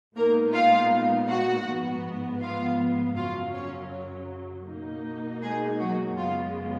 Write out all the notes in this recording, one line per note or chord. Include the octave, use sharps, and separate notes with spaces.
A#2 G#3 A#3 B3 D#4 A#4
F4 F5
F#4 F#5
G#2 F3 B3
F4 F5
F#2 C#3 F#3 C#4 F4 F5
C#4 C#5
B2 A#3 D#4
G#3 G#4
F#3 F#4
F#2 C#3 G#3 B3 F4